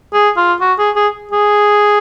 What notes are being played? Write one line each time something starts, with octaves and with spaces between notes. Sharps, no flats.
G#4
F4
F#4
G#4
G#4
G#4